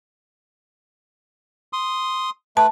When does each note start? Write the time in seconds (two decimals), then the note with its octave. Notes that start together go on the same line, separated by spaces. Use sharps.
1.73 C6 D#6
2.57 A3 B4 A5